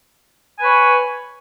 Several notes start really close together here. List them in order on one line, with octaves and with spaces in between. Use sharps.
G#5 B4 C#5